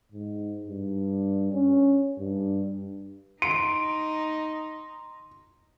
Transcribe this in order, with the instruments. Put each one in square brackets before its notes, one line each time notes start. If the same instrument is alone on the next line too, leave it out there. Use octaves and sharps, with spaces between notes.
[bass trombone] G#2
G2
C#4
G2
[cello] D#4 [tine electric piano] C6 [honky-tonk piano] D7